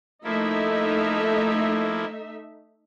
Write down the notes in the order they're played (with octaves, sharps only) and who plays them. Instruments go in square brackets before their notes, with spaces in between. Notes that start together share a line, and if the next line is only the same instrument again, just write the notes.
[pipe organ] F3 A#3 E4 [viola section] A3 D#4 E5